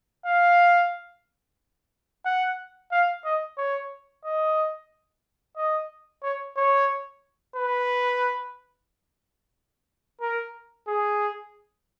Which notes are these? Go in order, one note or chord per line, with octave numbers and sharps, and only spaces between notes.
F5
F#5
F5
D#5
C#5
D#5
D#5
C#5
C#5
B4
A#4
G#4